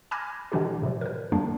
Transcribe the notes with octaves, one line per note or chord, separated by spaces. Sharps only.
G#5 B5 D6 F6 G#6 A#6
B2 D3 E3 D4 E4 G4
A2 C3 F3 F#3
A#4 B4
F#2 D3 D#3 G3 A#3 D4